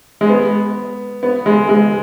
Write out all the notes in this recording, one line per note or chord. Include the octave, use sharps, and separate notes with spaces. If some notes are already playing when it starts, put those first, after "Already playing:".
G#3
B3
B3
G#3
G#3